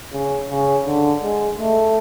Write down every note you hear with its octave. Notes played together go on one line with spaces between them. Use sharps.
C#3
C#3
D3
G#3
A3